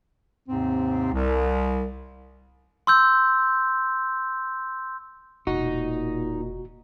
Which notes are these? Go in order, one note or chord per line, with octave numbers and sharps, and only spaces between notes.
D#2 G#2 C3 C4
C2
C6 E6 G6
E1 A#2 D#4 F#4